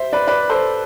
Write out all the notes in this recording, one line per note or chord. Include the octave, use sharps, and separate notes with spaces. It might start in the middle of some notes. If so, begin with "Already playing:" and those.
Already playing: C5 E5
B4 D5
B4 D5
A4 C5